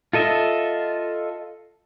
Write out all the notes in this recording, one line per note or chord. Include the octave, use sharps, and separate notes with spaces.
F4 A4 D#5 E5